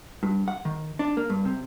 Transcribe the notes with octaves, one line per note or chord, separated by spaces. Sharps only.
G2
F#5
D#3
D4
A#3
G2
C3